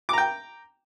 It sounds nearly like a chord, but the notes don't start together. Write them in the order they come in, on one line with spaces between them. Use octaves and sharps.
D6 A#5 G5